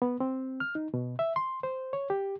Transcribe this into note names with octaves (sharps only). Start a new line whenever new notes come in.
B3
C4
F6
D#4
B2
E5
C6
C5
C#5
G4